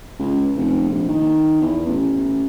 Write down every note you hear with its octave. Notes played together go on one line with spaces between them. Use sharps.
C#2
F1
A#1
D#3
E2
A1